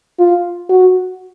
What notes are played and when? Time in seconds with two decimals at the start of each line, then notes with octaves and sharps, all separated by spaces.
0.19 F4
0.70 F#4